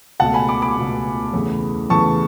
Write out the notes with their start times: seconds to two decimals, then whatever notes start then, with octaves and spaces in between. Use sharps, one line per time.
0.20 C#2 B2 A3 F#5 A5
0.34 G#5 B5
0.48 B5 D6
0.62 B5 D6
0.77 C#2 B2 A3
1.33 E2 C#3 E3 A3
1.90 E2 C#3 E3 A3 A5 C#6